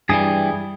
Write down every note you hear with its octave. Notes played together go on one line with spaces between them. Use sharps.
G2 E3 G3 G#4